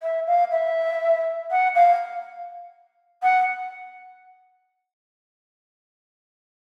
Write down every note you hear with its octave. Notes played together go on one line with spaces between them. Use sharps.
E5
F5
E5
F#5
F5
F#5